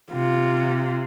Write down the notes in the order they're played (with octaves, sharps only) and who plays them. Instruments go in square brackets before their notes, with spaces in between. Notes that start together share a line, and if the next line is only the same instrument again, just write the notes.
[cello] C3 [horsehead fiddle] F4